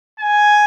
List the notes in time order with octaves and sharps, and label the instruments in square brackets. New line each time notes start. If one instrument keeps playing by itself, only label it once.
[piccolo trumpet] G#5